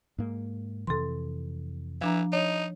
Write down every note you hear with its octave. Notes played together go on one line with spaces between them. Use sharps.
G#2 A#3
F2 C3 E3 A4 C6
E3 F3 D4 A#5
D#4 C#5